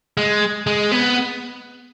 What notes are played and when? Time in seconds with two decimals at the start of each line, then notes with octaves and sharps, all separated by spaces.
0.17 G#3
0.67 G#3
0.91 B3